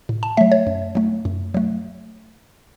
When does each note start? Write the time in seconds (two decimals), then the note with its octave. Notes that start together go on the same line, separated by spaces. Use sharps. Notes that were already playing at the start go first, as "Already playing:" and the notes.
0.09 A2
0.23 A5
0.37 F#3 A3 E5
0.52 C#5
0.67 F#2
0.95 F#3 A3
1.25 F#2
1.54 F#3 A3